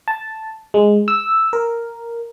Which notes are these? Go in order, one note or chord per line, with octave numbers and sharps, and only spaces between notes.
A5
G#3
E6
A#4